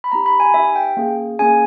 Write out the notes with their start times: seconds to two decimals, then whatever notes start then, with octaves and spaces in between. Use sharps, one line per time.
0.04 B5
0.12 B3 D#4 G4 A#5
0.26 B5
0.40 G#5
0.54 B3 D#4 G4 E5
0.76 G5
0.97 A#3 C#4 G#4
1.39 A#3 C#4 G#4 G#5